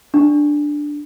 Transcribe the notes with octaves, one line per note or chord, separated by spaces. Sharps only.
D4